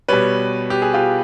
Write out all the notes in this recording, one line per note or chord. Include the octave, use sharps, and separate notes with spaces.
B2 G3 B4 C#5
G4
G#4
F4 G4